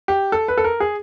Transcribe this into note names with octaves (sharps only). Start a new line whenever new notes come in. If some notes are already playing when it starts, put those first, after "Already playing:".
G4
A4
B4
A4
A#4
G#4